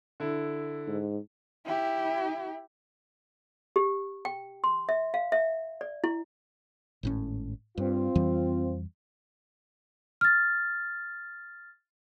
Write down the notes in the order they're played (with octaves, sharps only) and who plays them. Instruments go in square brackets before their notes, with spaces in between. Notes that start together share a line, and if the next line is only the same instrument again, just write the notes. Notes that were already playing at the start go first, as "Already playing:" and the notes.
[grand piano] D3 E4
[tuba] G#2
[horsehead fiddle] E4 G4
[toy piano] G4
G5
C6
E5
F5
E5
D5
E4
[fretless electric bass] G#1 A2 C#4
[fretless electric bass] G2 [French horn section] C4 F4
[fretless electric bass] F2 E3 G3
[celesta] F6 A6